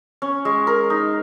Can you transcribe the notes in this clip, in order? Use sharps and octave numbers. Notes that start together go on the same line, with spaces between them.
C#4
G#3
A#4
D#4